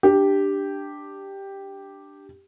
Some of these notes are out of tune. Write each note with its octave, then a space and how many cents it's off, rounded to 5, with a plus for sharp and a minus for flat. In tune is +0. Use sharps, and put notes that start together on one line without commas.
D4 +5 G4 +0